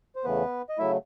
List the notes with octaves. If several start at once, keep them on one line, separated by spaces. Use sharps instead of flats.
C5
E2 C#3 E3 A3 B3 B4
D#5
C#3 F#3 A3 E4 E5